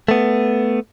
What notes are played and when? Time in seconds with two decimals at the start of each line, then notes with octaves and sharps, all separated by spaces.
0.08 A3 B3